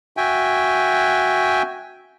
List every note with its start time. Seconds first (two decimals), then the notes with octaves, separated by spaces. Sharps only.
0.17 F#4 E5 G5 G#5